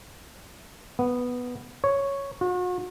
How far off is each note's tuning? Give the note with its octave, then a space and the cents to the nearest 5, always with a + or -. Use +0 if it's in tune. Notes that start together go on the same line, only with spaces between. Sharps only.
B3 +0
C#5 +0
F#4 -40